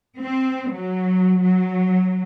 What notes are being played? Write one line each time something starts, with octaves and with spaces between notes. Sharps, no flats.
C4
F#3
F#3